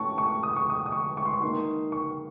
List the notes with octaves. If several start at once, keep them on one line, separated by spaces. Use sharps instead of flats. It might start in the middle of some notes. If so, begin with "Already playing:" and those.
Already playing: A2 A3 C#4 A5 C#6
C#6
D#6
C#6
D#6
D#6
C#6
C#6
C6
C#6
D#3 A#3 D#4 C6
C#6